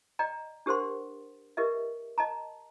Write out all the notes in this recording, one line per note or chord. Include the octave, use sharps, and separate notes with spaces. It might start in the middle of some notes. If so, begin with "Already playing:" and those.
D5 D#5 G5 A#5
D4 G4 A#4 C5 F#5 C6
G4 A#4 B4 D#5 E5
D#5 A5 A#5